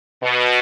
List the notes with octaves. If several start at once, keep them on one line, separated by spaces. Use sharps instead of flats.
B2